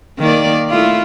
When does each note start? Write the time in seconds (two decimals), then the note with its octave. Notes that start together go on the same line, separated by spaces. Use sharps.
0.19 D#3 A#3 D5
0.70 A3 E4 F4